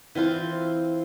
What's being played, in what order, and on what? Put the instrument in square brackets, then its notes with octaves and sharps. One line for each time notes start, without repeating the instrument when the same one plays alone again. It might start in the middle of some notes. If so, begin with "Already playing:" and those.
[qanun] E3 C4 F4 C5